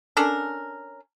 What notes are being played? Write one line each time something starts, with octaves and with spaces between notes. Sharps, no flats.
C#4 D4 A4 A#4